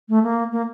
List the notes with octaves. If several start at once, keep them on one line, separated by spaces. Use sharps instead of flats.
A3
A#3
A#3